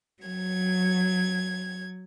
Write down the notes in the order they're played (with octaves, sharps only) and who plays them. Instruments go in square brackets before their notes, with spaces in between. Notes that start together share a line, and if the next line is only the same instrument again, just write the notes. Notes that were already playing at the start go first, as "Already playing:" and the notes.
[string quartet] F#3 G#6